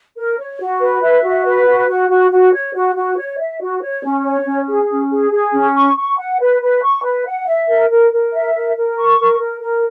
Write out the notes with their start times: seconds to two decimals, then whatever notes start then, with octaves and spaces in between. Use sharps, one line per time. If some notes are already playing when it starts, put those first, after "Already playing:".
0.17 A#4
0.38 C#5
0.60 F#4
0.80 B4
1.02 E5
1.23 F#4
1.45 B4
1.66 F#4
1.88 F#4
2.09 F#4
2.31 F#4
2.52 C#5
2.74 F#4
2.95 F#4
3.17 C#5
3.38 E5
3.60 F#4
3.81 C#5
4.03 C#4
4.24 C#5
4.45 C#4
4.67 G#4
4.89 C#4
5.11 G#4
5.32 G#4
5.53 C#4
5.74 C#6
5.97 C#6
6.18 F#5
6.39 B4
6.61 B4
6.83 C#6
7.03 B4
7.26 F#5
7.46 E5
7.68 A#4
7.90 A#4
8.12 A#4
8.33 E5
8.54 A#4
8.76 A#4
8.98 C#6
9.19 A#4
9.39 A#4
9.61 A#4